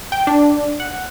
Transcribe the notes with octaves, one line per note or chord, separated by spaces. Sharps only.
G5
D4
F#5